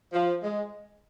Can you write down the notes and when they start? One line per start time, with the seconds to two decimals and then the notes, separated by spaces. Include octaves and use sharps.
0.13 F3
0.43 G#3